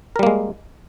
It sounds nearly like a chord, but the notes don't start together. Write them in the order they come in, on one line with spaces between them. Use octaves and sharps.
A#4 G3 A#3 G#3